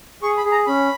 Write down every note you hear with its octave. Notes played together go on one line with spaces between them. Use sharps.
G#4 C#6
B5
G#4
A#5
C#4 B5